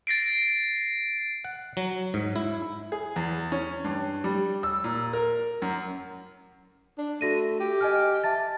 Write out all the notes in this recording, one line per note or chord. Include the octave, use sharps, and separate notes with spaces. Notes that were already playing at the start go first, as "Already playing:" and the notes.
A6 A#6 C7 D7
F#5
F#3
G#2
E4
G#4
E2
C#4
G2
G3
E6
A#2
A#4
F#2
D4
A3 F#4 A#6 D#7
G4
D#5 G#5 F6
E5 A5 A6